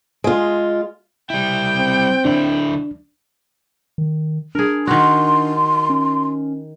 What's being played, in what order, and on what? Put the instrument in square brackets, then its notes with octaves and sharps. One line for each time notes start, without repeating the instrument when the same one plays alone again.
[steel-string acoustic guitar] G#3 F4
[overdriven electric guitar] G3 E4 [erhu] G5
[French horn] C4
[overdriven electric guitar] D3 E4 [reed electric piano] D4
[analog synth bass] D#3
[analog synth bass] D4 [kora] G#4 A#4
[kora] D#3 F#4 [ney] C6
[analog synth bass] C#4